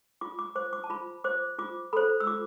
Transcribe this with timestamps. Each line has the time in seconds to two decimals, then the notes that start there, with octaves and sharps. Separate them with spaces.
0.21 F4 D6
0.39 D6
0.56 C5 D6
0.73 D6
0.84 A5
0.90 F4 B5
1.24 C5 D6
1.59 F4 D6
1.93 A4 C5 B5
2.20 E6
2.27 F4 D6